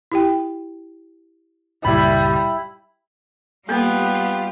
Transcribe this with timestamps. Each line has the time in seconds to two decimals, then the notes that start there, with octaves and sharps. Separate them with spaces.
0.12 E4 G4 G5
1.84 C#2 G2 A#2 G3 E4 B5
3.69 G3 A#3 B3 F4 G4 A4